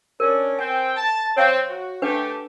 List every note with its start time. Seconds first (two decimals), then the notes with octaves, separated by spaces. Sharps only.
0.20 C#4 D4 A#4
0.59 C4 G5 G#5
0.96 A5
1.36 C4 C#5 F5 C#6
1.68 F#4
2.02 A3 D4 G4 B4 F#5